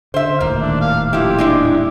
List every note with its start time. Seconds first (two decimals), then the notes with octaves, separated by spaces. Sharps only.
0.14 D3 C5 E5
0.41 D#1 D#2 A2 A#3
0.61 D4
0.81 F5
1.13 F3 E4 G4
1.38 G#3 D4 E4